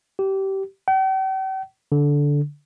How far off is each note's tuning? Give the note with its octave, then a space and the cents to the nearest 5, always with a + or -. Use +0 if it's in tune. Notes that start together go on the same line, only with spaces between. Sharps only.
G4 -20
G5 -45
D3 -15